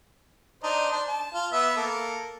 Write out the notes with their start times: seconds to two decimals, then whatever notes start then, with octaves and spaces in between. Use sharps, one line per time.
0.63 D4 D#4 C5
0.92 D4 C5
1.08 A5
1.34 F4
1.52 B3 E5
1.77 A#3 A4